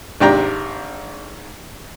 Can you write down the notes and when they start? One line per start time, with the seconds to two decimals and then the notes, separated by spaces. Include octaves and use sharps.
0.20 G#1 C3 D4 G5 A#5